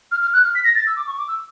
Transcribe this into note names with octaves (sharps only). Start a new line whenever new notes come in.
F6
F6
F#6
F6
B6
A#6
A6
E6
D6
C#6
D6
E6